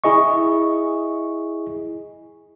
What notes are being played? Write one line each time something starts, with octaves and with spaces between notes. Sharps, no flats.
E4 G#4 D#5 C#6